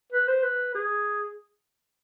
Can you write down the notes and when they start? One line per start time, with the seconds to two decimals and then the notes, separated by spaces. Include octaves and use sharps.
0.13 B4
0.28 C5
0.43 B4
0.75 G#4